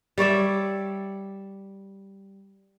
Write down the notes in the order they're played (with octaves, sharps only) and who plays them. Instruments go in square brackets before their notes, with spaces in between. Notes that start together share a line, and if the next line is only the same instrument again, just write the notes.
[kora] G3 C#5 D5 E5